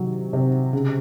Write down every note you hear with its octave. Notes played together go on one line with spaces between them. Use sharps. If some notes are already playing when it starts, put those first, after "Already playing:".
Already playing: C3 D#3 F#3
C3
C#3